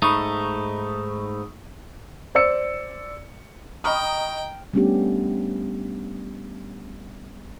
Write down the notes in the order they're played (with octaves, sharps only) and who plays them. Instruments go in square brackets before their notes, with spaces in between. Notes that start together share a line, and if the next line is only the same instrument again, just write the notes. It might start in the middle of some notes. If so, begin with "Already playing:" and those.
[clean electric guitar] G#2 A3 D#4 [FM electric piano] B5 C#6 D#6
[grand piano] C5 D5 E6 C#7
[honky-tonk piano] D#5 A#5 D#6 [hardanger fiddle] G5 [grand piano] B5 C#6 F6
[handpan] G3 A3 B3 C#4 D4 G4